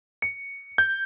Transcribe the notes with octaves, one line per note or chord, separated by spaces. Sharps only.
C#7
G6